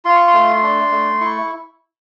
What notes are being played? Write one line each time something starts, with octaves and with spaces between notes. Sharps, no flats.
F4 C6
C#6
C6
A3
D4
A3
E4 C#6